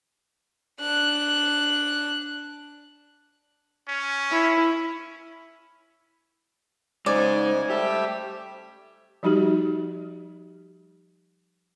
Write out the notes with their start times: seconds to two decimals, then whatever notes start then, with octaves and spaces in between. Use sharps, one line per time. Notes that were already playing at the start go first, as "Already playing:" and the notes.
0.80 D4 F#6
3.88 C#4
4.31 E4
7.06 C#3 G#3 D#4 C5 D5 G#5
7.70 G3 A3 G4 E5
9.23 F3 G3 D#4 F#4 G4